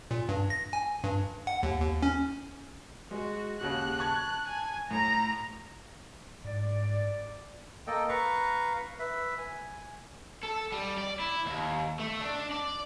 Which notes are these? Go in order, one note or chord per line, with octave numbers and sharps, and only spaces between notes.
A#2
G2
A#6
G#5
G2
F#5
D#2
D#2
C#4
G#3 F#4
D#2 C#3 F#4 F#6
A5 C#6 G#6
G#5
A2 A#5
G#2 D5
A#3 A4 D#5 G5
B4 F5 A#5 C#6
B4 E5
G#5
A4
G3
D5
E4
D#2
A3
D4
D5